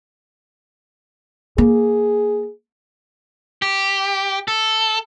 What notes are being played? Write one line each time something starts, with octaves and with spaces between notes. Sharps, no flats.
A#3 G#4
G4
A4